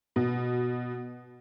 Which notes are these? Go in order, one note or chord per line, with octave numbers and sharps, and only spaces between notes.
B2